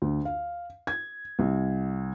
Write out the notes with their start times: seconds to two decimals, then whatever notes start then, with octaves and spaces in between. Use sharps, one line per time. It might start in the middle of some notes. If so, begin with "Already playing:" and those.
0.02 D2
0.25 F5
0.87 G#6
1.39 C2